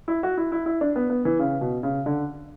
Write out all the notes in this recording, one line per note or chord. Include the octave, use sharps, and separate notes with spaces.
E4
F#4
E4
E4
E4
D4
B3
B3
E3
C#3
B2
C#3
D3